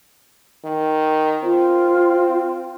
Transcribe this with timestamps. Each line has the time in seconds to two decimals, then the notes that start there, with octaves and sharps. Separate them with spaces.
0.64 D#3
1.43 C4 F4